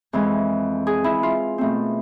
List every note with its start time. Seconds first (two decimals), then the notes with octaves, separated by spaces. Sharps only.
0.13 F2 E3 G#3
0.87 G#4
1.04 E4
1.23 F4
1.58 B2 A3 C4